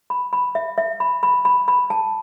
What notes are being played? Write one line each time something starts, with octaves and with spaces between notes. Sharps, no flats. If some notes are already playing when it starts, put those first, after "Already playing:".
B5
B5
E5
E5
B5
B5
B5
B5
A5